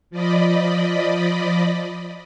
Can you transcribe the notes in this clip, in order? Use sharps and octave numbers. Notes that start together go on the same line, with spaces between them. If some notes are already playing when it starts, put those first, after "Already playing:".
F3 D5 D#5 B5